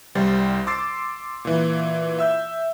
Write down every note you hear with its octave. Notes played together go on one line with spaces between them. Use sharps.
C2 G3 C5 A6
C6 D6 E6 A6 C7
A#2 E3
E5 E6 G6